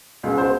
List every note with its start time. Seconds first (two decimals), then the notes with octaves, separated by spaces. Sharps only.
0.23 C#2 B2 G#3 B3
0.38 C5